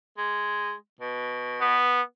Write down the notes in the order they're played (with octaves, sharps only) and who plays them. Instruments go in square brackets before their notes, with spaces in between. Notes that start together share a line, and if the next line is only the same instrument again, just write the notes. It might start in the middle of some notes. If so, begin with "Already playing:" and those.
[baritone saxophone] G#3
B2
[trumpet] B3